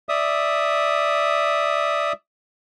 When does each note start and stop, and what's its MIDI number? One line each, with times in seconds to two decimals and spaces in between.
0.09 2.13 74
0.09 2.13 76
0.09 2.13 87